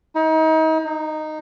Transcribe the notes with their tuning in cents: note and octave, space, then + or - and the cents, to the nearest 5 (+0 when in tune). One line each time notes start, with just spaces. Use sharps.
D#4 +35
D#4 -10